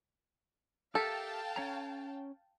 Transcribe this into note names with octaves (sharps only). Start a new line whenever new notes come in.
G4 A4 A#4 E5 F5 G5 A5
C#4 C#5 A#5